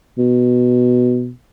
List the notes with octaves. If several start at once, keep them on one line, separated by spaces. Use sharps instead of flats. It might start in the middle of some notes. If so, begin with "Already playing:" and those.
B2